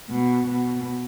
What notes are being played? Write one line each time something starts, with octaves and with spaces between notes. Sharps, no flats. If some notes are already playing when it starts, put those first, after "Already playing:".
B2
B2